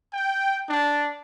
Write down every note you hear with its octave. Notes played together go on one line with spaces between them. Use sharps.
G5
D4